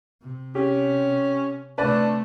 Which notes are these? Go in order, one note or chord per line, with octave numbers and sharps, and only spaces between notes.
C3
C#4 G4
C3 A3 D4 B4 D5 A5